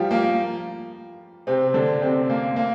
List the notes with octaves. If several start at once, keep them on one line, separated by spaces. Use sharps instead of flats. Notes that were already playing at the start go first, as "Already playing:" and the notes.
Already playing: F3 G3 F4 G4
A#3
C3 C4
D3 D4
C3 C4
A#3
A#3